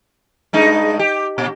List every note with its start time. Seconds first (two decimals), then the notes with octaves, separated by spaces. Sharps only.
0.53 G2 G#3 D#4
0.99 G4
1.38 A#2